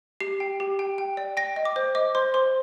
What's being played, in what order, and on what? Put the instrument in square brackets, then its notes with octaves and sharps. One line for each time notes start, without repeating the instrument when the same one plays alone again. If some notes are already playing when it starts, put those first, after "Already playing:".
[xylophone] G4 C7
G5
G4
G5
G5
D5
G5 A#6
D#5
D6
C5
D#5 D6
C5 C6
C5 C6